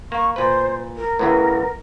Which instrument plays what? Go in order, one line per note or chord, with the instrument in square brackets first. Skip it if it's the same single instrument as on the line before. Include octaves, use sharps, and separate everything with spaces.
[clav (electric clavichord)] A#3 [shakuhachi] C#6
[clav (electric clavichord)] A#2 B4 [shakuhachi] C5
[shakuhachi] A#4
[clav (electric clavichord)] A2 C#3 E3 [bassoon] B3